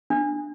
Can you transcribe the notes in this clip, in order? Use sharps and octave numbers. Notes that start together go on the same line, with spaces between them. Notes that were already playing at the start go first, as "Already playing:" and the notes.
D4